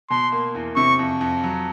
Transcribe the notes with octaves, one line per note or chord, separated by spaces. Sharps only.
B2 C6
A#3
E2
C3 C#6
F2
F2
F#3